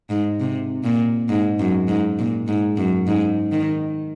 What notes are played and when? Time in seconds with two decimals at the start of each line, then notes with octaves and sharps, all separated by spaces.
0.10 G#2
0.40 C3
0.84 A#2
1.29 G#2
1.59 F#2
1.88 G#2
2.19 A#2
2.48 G#2
2.77 F#2
3.07 G#2
3.52 D#3